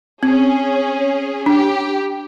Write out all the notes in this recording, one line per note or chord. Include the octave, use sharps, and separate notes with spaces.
C4 C#4 G#4
D4 G4